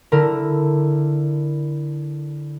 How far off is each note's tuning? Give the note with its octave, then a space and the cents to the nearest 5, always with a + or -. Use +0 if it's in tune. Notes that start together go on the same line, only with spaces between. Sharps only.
D3 +0 E4 +0 A#4 +0